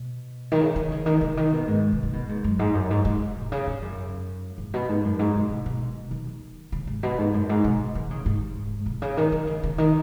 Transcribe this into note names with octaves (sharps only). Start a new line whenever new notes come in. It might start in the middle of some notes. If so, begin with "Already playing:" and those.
Already playing: B2
D#3
C#3
D#3
C#3
D#3
C#3
D#3
B2
G#2
B2
D#3
B2
G#2
F#2
G#2
F#2
G#2
G#2
B2
C#3
G#2
F#2
G#2
B2
G#2
F#2
G#2
B2
B2
B2
D#3
D#3
C#3
G#2
B2
G#2
F#2
G#2
B2
D#3
C#3
G#2
B2
C#3
D#3
D#3
C#3
C#3
D#3